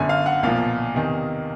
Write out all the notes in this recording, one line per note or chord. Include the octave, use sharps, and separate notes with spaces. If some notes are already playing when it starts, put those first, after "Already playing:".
Already playing: G1 F#2 D3 G#5
F5
F#5
B1 A#2 F3 F5
E2 C3 D#3